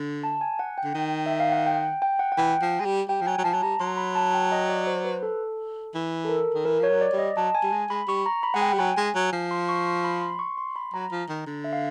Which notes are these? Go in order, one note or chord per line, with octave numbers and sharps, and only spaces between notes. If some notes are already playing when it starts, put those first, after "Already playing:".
Already playing: D3
A5
G#5
F#5
G5
D3
D#3
E5
F5
F#5
G5
G5
F#5
F#5
E3 G5
F3
G#3
G3
G3 G5
F3
F#3 G#5
F#3
F3 A5
F#3
G3 A#5
F#3 C6
B5
A5
G5
D#5
D5
C5
B4
A4
E3
A4
A#4
D#3
E3 A#4
F3 C#5
F#3
D5
G3
D#5
F#3 A5
G#5
G3
G#3
G#3 B5
G3 C#6
A#5
B5
G#3 F#5
G5
G3
F#3 G#5
G#3
F#3
F3
C6
C#6
C6
B5
C6
C#6
C6
B5
F#3 A#5
F3
D#3
D3
E5
F5